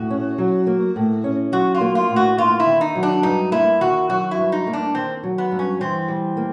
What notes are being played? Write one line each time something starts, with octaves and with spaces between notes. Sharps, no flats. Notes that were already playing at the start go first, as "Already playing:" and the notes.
Already playing: A2 F#4
C#4
F#3
A#3
A2
C#4
F#3 F#4
F4
A#3
F4
A2
F#4
A#3 F4
E4
D#3
D#4
F#3
D4
G2 D#4
A#3 E4
D#3 F#4
F#3 F#4
E4
G2
D#4
A#3
D4
D#3 C4
F#3
B3
G2
C#4
E3 C4
G3
A#3